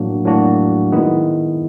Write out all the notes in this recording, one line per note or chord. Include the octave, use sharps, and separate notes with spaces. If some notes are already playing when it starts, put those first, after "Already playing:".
Already playing: A2 F#3 A#3 D4 F#4
A2 F#3 A#3 D4 F#4
D#3 G#3 B3 E4